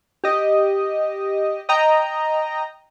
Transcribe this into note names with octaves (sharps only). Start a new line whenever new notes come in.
G4 D#5
D#5 G5 A#5